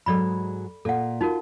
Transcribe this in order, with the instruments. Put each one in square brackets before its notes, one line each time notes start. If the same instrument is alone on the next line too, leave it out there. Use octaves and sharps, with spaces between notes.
[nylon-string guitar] G#2 F#3 G#3 [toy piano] A4 D5 B5
[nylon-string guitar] A#2 [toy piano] A4 F#5
[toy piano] D#4 F#4 A#4 [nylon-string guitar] F4